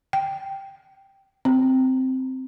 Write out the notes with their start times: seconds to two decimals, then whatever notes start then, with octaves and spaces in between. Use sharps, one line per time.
0.13 G5
1.45 C4